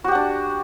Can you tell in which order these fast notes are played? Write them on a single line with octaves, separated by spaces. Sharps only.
F#4 G4 F#5 D4